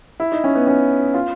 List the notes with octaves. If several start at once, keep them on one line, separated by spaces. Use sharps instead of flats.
E4
D#4
C#4
B3
C#4
F4